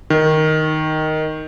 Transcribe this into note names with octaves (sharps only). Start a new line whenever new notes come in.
D#3